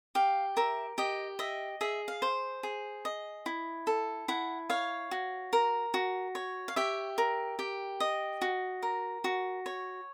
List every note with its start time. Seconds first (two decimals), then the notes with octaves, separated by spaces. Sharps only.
0.15 G4 F5
0.57 A#4 E5
0.98 G4 D#5
1.39 D#5 E5
1.81 G#4 E5
2.08 F5
2.22 C5
2.63 G#4
3.05 D#5
3.46 E4
3.87 A4
4.28 E4 F#5
4.70 C#5 F5
5.11 F#4
5.53 A#4
5.94 F#4
6.35 C#5
6.68 F5
6.76 G4 E5
7.18 A#4
7.59 G4
8.00 D#5
8.42 F#4
8.83 A#4
9.24 F#4
9.66 C#5